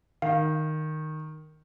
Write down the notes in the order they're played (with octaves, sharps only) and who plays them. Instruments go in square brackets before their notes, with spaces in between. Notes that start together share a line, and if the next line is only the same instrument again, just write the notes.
[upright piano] D#3 [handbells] F5